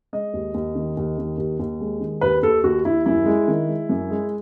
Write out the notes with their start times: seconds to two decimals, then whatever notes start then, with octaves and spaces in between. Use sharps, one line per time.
0.13 G#3 D#5
0.33 D#2
0.54 D#2
0.75 D#3
0.97 D#2
1.18 D#3
1.38 D#2
1.59 D#2
1.81 G#3
2.00 D#3
2.21 D#2 B4
2.42 D#2 A4
2.64 D#2 F#4
2.85 D#2 E4
3.06 F#2 E4
3.26 G#3
3.48 D#3
3.68 G#3
3.89 F#2
4.11 G#3